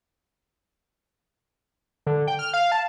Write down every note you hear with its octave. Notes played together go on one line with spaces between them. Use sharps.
D3
G5
F6
F5
A5